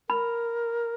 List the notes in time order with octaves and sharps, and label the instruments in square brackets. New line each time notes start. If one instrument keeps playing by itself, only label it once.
[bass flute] A#4 [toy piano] B5